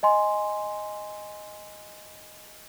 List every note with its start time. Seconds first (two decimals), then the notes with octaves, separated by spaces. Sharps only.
0.03 D#5 G#5 C6